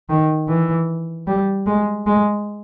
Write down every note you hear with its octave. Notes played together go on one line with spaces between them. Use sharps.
D#3
E3
G3
G#3
G#3